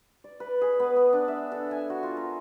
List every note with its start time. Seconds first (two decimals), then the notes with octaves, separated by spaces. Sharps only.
0.24 D5
0.40 B4
0.61 G#4
0.80 B3
0.96 B3
1.13 D4
1.28 E5
1.52 A4
1.71 G#5
1.90 F#4
2.03 F4
2.17 A#4